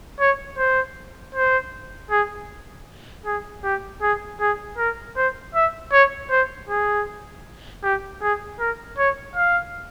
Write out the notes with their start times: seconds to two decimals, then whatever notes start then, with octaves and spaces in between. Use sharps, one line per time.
0.20 C#5
0.58 C5
1.35 C5
2.11 G#4
3.26 G#4
3.64 G4
4.02 G#4
4.41 G#4
4.78 A#4
5.17 C5
5.55 E5
5.93 C#5
6.31 C5
6.69 G#4
7.83 G4
8.22 G#4
8.59 A#4
8.98 C#5
9.36 F5